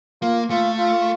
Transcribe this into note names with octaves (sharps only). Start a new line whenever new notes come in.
A#3 F4
A3 F4
F4